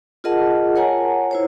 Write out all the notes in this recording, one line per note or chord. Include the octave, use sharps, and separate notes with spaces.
F4 G#4 A#4 D#5 F#5 A5
A#4 C#5 F#5 G#5 A#5
E4 C5 C#5